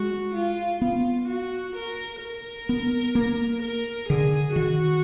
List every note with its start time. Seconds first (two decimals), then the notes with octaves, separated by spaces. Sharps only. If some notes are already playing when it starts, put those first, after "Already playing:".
Already playing: G#3 F#4
0.34 F4
0.82 B3 F4
1.28 F#4
1.76 A#4
2.22 A#4
2.69 B3
3.15 A#3
3.62 A#4
4.09 D3 G#4
4.56 D#3 F#4